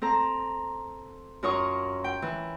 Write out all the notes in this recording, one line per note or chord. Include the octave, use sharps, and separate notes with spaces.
C4 A4 A#5
F#2 F4 A#4 C#5 C#6 D#6
G5
E3